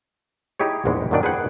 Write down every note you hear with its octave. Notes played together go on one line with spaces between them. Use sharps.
D#4 E4 G4 G#4 C#5
A#1 E2 G#2 D#3 E3 G#3
F#2 A#2 D#3 D4 D5
G#4 B4 C5 F#5 G5